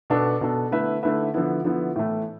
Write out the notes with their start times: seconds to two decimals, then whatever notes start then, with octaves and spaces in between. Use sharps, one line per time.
0.10 B2 B3 D4 A4
0.41 B2 B3 D4 A4
0.71 D3 A3 E4 B4 E5
1.03 D3 A3 E4 B4 E5
1.34 D3 F3 B3 E4
1.65 D3 F3 B3 E4
1.96 A2 E3 A3